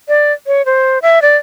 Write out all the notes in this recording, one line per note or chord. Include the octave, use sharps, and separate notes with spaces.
D5
C#5
C5
E5
D5